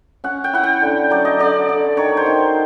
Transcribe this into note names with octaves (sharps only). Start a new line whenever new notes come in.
C#4 F#5
G5
E4 F#5
G5
D3
F#3 D5
D#5
D3 D5
D3
D#3 C#5
C5
D#3